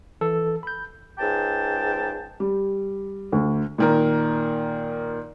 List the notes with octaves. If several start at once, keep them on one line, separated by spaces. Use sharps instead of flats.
E3 A4
B5 G6
C#2 G#2 G5 A5
G3
D2
A#2 D#3 A#4